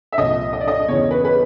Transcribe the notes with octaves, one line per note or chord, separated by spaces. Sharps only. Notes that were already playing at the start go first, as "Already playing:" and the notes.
E5
C2 A#2 F3 D#5
D#5
D5
D#5
E2 C#3 E3 C#5
B4
B4